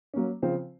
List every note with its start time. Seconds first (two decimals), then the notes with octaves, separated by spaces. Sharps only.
0.14 F#3 A#3 C#4
0.42 C#3 F3 C4 F4 C5